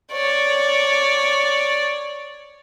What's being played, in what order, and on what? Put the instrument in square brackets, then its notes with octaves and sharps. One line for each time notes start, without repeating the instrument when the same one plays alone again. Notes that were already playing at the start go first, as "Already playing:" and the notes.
[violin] C#5 D5